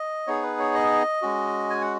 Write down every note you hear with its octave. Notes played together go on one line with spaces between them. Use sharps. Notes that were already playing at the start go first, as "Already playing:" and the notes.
Already playing: D#5
B3 D#4 G#4 C#5
B4
C#5
D#5
G#3 C#4 F#4
G#5
F#5